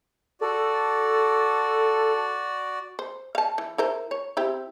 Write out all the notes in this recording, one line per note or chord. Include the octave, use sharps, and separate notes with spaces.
F#4 A4 D5
C5
F5 A5
E3
E4 A#4 C5
C#5
C4 E4 G4